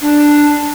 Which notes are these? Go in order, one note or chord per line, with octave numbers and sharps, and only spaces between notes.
D4